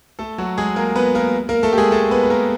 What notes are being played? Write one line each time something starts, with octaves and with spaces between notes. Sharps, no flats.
A3 A4
F#3 F#4
G#3 G#4
A#3 A#4
B3 B4
A#3 A#4
A#3 A#4
A3 A4
G4
G#3 G#4
A3 A4
B3 B4
B4
A#3 A#4